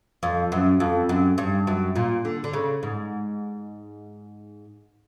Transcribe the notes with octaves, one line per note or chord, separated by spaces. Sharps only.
F2
F#2
F2
F#2
G2
F#2
A#2
D3
D3
C#3
G#2